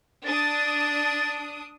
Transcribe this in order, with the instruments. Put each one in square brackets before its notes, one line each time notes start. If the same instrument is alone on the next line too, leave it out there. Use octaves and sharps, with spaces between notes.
[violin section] D4 D#6 [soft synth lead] A6